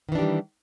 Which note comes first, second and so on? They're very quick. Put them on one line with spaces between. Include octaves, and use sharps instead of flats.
D#3 E3 D4 G4 G3